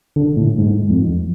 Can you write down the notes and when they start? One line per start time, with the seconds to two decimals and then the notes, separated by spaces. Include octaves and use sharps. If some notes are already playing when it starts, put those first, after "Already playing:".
0.16 D3
0.37 A2
0.58 G#2
0.90 F2